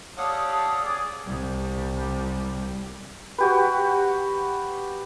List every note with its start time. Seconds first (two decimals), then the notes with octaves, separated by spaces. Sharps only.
0.18 G4 A4 C#5 D5 F5 F#5 D#6
0.80 G#4 D5
1.28 C2 G3
3.38 F#4 G4 B4